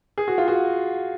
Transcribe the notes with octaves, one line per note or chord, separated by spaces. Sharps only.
G#4
F#4
F4
F#4